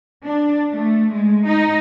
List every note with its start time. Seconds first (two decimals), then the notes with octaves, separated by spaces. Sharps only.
0.25 D4
0.72 A3
1.11 G#3
1.45 D#4